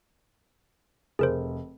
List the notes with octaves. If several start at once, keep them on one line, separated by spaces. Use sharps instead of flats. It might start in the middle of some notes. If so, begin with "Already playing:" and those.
F1 G#4 A#4 C5